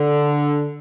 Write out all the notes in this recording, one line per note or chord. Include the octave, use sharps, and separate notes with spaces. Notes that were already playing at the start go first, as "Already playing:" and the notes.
Already playing: D3